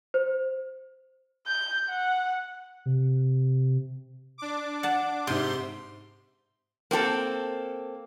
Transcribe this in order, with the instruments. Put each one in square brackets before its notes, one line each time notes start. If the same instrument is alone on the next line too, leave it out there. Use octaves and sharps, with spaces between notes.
[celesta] C5
[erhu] G6
F#5
[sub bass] C3
[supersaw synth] D4 D6
[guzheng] F#5 A5
[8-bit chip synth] G#2 C6 [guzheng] C3
[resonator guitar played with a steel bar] A#3 C4 F#4 A4